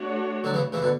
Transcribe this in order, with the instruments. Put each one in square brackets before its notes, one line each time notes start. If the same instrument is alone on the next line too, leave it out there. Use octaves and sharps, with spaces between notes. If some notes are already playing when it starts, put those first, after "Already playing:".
Already playing: [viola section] A3 D4 F#4 C#5
[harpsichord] D3 F#3
C#3 E3
C#3 E3
B2 D3